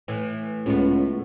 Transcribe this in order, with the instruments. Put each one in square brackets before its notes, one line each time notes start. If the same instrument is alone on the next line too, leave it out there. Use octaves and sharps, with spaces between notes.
[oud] A2 E3
[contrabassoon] C#2 [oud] A2 B3